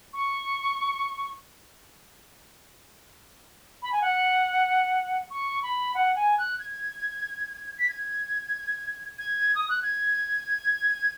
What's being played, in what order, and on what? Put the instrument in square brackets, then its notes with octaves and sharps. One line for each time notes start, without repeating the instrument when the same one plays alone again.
[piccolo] C#6
B5
G#5
F#5
C#6
B5
F#5
G#5
F#6
G#6
B6
G#6
G#6
D#6
F#6
G#6